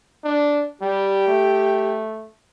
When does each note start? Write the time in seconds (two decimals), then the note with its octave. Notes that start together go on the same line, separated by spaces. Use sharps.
0.24 D4
0.81 G3 G4
1.28 A3